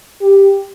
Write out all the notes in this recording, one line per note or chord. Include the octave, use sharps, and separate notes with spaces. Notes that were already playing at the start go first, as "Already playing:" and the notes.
G4